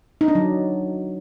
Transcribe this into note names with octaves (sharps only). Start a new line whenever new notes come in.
D#4
D4
F#3